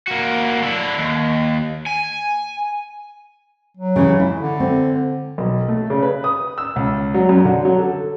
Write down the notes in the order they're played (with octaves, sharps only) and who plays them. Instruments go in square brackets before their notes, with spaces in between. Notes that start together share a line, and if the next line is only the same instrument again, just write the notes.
[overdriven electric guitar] A#3 F#4
D3 E4
D#2
G#5
[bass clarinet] F#3
[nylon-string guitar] C#3 E3
E4
[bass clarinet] D3
[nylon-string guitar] C4
[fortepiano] B1
A3
C#3
B4
D#6
E6
C#2
F#3
F#2
D3
F#3
A4